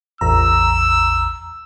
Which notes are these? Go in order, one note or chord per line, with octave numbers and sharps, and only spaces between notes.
A1 E2 A#5 E6